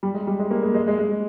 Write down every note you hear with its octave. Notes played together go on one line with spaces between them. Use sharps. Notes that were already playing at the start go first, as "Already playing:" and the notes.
G3
G#3
G3
G#3
A#3
G#3
G#3
G#3
G#3